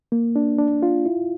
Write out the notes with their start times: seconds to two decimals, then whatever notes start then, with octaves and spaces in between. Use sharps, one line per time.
0.12 A#3
0.36 D4
0.58 D4
0.83 F4
1.06 E4